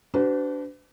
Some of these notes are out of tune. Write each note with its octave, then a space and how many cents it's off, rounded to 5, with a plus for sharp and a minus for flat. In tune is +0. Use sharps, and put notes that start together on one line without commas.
D4 -15 F#4 +40 B4 +45